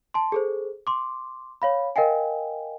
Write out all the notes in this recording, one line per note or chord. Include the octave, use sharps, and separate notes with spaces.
A5 C6
G#4 A4 C5
C6 D6
C#5 F5 B5
A#4 D#5 F5 G5 G#5